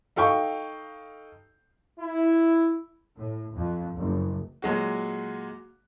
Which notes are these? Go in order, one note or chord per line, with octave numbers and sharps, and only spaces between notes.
D#4 A4 F5 G5 C#6
E4
A2
F2
F#1
A#2 F#3 G#3 F#4